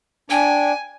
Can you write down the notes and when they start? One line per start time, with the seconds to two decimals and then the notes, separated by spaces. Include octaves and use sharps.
0.30 D4 G5 G#5